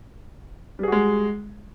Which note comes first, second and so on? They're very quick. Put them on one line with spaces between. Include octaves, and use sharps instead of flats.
G3 G#4 F#4 G#3